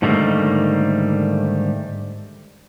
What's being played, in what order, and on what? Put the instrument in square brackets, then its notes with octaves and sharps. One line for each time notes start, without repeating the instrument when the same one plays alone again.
[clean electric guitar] G#2 D3 D#3 G3 A3 A#3